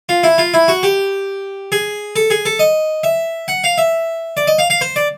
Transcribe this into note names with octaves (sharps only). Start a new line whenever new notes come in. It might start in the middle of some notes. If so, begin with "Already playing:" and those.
F4
E4
F4
E4
F#4
G4
G#4
A4
G#4
A4
D#5
E5
F#5
F5
E5
D5
D#5
F5
F5
C5
D5